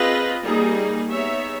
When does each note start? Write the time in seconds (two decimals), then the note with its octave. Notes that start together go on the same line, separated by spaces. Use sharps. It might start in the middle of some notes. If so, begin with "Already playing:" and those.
Already playing: C4 F4 G#4 B4 D#5
0.44 G3 A#3 D#4 G#4
1.11 B3 D#4 G#4 C#5 E5